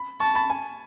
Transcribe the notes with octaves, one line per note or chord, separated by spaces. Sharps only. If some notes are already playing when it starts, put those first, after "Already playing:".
Already playing: B5
A5 C#6
B5
G#5